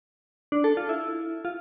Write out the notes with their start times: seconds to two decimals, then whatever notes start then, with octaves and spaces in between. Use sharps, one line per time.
0.52 D4
0.64 A4
0.77 F4
0.89 E4
1.45 F4